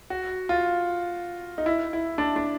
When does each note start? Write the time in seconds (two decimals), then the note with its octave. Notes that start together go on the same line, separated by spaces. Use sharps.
0.10 F#4
0.49 F4
1.58 D#4
1.66 E4
1.93 E4
2.18 D4
2.36 D4